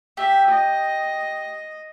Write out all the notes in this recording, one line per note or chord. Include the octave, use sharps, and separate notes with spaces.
G4 E5
D#5